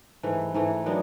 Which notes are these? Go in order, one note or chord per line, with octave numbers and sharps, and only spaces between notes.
G#2 E3 A3
G#2 E3 A3
D#3 F#3 B3 D4